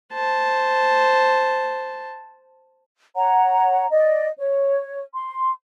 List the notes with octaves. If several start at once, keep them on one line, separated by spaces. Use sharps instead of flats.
C5 A5
C#5 F#5 A#5
D5 D#5
C#5
C6